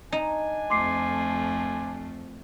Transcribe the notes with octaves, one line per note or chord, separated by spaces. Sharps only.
D4 D#4 G#5
F2 F3 A3 C6 D6 C7